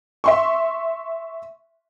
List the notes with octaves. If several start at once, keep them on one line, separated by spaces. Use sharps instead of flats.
E5 C6 C#6